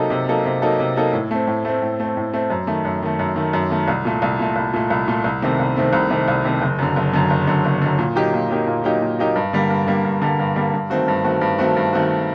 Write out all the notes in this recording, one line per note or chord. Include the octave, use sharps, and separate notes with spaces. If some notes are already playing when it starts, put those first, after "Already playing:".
Already playing: C3 F#3 A#3 D#4 A4
C3
F#3 A#3 D#4 A4
C3
F#3 A#3 D#4 A4
C3
F#3 A#3 D#4 A4
A2
A3 C4
A2
A3 C4
A2
A3 C4
A2
A3 C4
F#2
D#3 A3
F#2
D#3 A3
F#2
D#3 A3
F#2
D#3 A3
C2
A#2 A3
C2
A#2 A3
C2
A#2 A3
C2
A#2 A3
C2
C3 D#3 A3 C4
C2
C3 D#3 A3 C4
C2
C3 D#3 A3 C4
C2
C3 D#3 A3 C4
F#1
F#2 D3
F#1
F#2 D3
F#1
F#2 D3
F#1
F#2 D3
A#2
F#3 A#3 D#4 G4
A#2
F#3 A#3 D#4 G4
A#2
F#3 A#3 D#4 G4
A#2
F#3 A#3 D#4 G4
G2
D3 G3 A#3
G2
D3 G3 A#3
G2
D3 G3 A#3
G2
D3 G3 A#3
G2
D#3 A3 C4 F#4
G2
D#3 A3 C4 F#4
G2
D#3 A3 C4 F#4
G2
D#3 A3 C4 F#4